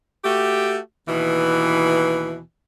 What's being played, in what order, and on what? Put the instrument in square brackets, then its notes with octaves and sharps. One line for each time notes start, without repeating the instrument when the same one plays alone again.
[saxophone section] A3 F#4 G4
D#2 B2 E3